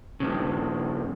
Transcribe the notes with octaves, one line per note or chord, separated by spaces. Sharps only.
G2 C#3